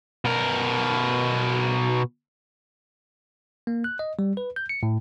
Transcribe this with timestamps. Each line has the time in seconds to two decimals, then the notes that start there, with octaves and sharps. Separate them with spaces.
0.25 B2 A#4
3.67 A#3
3.84 F#6
3.99 D#5
4.19 G3
4.37 B4
4.56 G6
4.69 C#7
4.83 A2